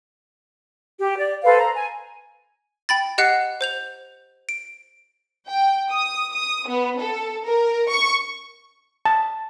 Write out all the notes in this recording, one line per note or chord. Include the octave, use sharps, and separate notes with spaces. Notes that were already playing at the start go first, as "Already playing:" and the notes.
G4
D5
A4 B4 C5 F5
A#5
G#5
G5 B5 A6
G4 D#5 F#5 F#6 C7 C#7
C5 G6 F7
D7
G5
D#6
D#6
B3
A4
A#4
C#6
A5